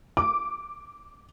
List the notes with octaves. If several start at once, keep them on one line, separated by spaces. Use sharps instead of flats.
D6